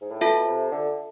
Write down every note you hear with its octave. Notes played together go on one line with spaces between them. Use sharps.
G#2
A2
B2 F4 A4 E5 A5
C3
D3